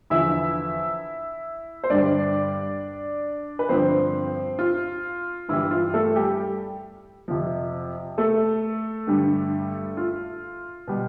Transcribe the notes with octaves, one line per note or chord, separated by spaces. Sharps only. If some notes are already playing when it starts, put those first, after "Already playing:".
E2 D3 F3 E4 E5
C5
G2 D3 G3 D4 D5
B4
G2 D3 F3 C4 C5
F4
G2 E3 G3 E4
F4
A3 A4
G3 G4
F2 C3 F3
A3 A4
G2 D3 G3
F4
B2 G3